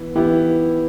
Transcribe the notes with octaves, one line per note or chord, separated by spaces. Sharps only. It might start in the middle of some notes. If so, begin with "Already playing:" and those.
Already playing: E3 B3 E4
E3 B3 E4 G4